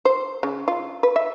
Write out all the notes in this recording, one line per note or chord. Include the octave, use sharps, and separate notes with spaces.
C5
C#3
F4
B4
E5